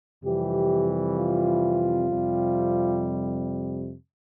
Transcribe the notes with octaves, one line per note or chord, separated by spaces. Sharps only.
F2 C3 E3 G3 G4
F4
F2 C3 G3